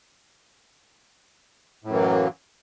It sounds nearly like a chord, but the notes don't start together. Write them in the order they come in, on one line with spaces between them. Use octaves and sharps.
A2 F#2 E3 A#3 F#3